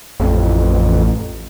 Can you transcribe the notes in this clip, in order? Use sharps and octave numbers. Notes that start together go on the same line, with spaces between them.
A1 F2